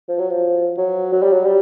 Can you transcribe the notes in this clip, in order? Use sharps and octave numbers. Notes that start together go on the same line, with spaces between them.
F3
F#3
F3
F#3
F#3
G3
F#3
G3